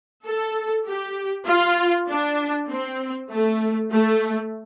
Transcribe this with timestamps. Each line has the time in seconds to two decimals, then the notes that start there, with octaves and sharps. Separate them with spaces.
0.25 A4
0.86 G4
1.47 F4
2.08 D4
2.69 C4
3.30 A3
3.91 A3